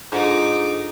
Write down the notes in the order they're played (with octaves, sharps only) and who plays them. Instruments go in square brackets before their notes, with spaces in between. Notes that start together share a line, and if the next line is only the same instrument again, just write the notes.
[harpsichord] G#2 [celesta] D4 F4 A4 [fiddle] D#4 D6